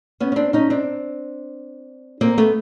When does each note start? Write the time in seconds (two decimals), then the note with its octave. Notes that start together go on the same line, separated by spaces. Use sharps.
0.20 B3 C#4
0.32 C#4
0.36 C4 D4
0.53 C#4 D#4
0.70 C4 D4
2.21 A#3 C4
2.38 A3 B3